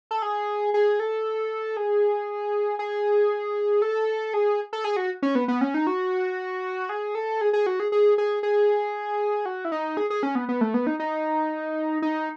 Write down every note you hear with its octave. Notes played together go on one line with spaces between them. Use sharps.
A4
G#4
G#4
A4
G#4
G#4
A4
G#4
A4
G#4
F#4
C#4
B3
B3
C#4
D#4
F#4
G#4
A4
G#4
G#4
F#4
G#4
G#4
G#4
G#4
F#4
E4
D#4
G#4
G#4
C#4
B3
B3
A3
B3
D#4
D#4
D#4